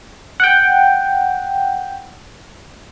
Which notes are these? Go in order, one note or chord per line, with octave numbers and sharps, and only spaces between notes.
F#5 G5